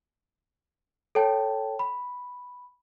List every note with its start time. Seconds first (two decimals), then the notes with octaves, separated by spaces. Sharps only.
1.15 A4 C#5 G5 A5
1.79 B5